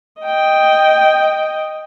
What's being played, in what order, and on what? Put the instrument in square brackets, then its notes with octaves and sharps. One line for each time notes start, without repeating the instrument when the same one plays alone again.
[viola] D#5 G5